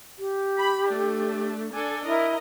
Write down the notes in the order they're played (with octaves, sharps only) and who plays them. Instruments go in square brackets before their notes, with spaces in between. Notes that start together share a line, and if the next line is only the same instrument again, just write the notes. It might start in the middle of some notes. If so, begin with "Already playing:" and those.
[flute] G4
[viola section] B5
A3 D4
D4 A4 G#5
[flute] E4 [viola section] A#4 D#5